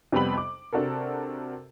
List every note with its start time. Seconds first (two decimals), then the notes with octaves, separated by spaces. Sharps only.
0.12 F2 C3 G3 B3 B5 F#7
0.37 D6
0.73 C3 D4 F#4 A4 A#4